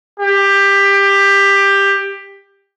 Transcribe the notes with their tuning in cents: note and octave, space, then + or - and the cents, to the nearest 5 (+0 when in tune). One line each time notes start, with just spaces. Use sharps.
G4 +15